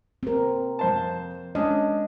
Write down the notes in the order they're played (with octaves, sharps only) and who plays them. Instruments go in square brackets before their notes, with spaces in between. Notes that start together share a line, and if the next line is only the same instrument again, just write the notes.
[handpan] C4 A#4
[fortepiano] F2 C5 A5
[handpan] G#3 D#5 [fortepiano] C#4 D4